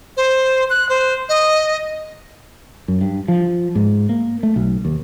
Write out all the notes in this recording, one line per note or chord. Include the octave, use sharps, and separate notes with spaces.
C5
F#6
C5
D#5
F#2
G2
F3
G#2
A#3
A3
B1
D#2